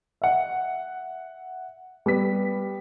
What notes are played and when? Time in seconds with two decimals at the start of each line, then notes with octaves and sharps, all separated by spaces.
0.22 E5 F#5
2.06 G3 B3 B6